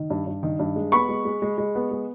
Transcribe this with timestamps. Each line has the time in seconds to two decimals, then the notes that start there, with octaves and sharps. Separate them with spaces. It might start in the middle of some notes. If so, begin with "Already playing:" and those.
Already playing: D#3
0.10 G2
0.27 G2
0.43 D#3
0.59 G2
0.76 G#3
0.92 B3 B5 C#6
1.09 G#3
1.25 G#3
1.42 G#3
1.58 G#3
1.75 B3
1.91 G#3